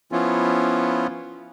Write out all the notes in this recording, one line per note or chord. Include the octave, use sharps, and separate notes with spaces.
F3 B3 C#4 E4 F4